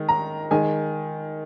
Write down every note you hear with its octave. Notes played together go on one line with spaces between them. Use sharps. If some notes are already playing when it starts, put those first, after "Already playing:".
Already playing: D#3 G#3
A#5
D#3 G#3 G#5